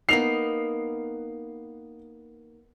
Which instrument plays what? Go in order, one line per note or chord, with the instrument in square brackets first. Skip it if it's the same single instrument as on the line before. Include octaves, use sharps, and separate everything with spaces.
[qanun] A#3 B3 D#4 [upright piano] C7 F7